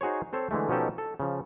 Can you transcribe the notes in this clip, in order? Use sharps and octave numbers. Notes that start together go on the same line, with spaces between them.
D#4 F#4 G#4 C5 C#5
C4 A4 C5 C#5
D3 E3 G#3 A3
B2 F3 C#4 D#4 G4 A4
A4
C#3 F3